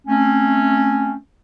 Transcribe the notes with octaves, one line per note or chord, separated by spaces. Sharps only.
A3 C4 C#4